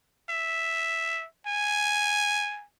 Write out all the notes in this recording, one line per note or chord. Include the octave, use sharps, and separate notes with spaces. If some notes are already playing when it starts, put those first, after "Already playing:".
E5
G#5